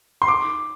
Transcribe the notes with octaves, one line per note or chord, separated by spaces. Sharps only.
C6
D6